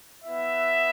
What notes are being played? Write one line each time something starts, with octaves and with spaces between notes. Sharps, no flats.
B3 E4 E5